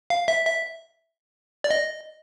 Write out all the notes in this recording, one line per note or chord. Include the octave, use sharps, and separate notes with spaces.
F5
E5
E5
D5
D#5